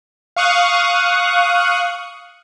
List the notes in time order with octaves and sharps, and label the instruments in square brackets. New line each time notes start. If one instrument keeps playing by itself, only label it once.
[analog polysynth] F5 C#6 D#6 F#6